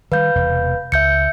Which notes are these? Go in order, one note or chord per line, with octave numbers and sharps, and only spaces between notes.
D#3 G3 B4 F5 G6
E1 E2 C3
C#2 E5 G6 C#7